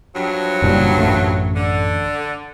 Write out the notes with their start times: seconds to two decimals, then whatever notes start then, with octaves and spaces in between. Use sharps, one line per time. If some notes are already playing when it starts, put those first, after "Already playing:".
0.15 G2 F3 F#3
0.62 F#1 A#2 G3
0.97 A1 F#2 A3
1.55 D3